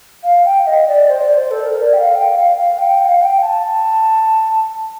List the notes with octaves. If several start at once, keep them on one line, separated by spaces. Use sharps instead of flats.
F5
G5
D#5
D5
C5
D5
C5
A4
A#4
D5
G5
F5
G5
F5
F5
G5
G5
F5
G5
A5